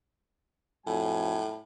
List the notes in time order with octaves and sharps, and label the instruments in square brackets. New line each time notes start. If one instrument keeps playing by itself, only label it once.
[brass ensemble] F2 F#3 G#5 [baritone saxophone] A2